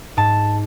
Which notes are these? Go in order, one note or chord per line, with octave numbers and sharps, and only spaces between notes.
G#2 A5